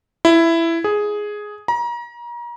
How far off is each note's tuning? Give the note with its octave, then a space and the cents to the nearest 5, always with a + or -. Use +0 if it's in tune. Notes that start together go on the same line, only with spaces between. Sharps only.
E4 +10
G#4 +5
A#5 +35